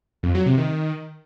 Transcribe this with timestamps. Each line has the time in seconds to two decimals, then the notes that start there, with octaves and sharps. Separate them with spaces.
0.23 F2
0.35 F#3
0.46 C3
0.58 D#3